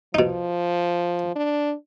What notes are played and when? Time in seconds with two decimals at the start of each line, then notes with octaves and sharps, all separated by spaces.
0.14 B2 F3 D#4
1.35 D4